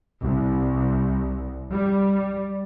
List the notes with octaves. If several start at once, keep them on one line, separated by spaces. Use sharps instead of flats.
C2
G3